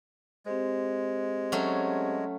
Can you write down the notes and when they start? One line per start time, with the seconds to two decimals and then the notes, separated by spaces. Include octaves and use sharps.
0.46 G#3 C4 G4 C5
1.52 F#3 A3 C#4